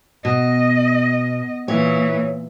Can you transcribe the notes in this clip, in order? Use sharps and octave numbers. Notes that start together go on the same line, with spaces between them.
B2 D#5
A#2 E3 C#5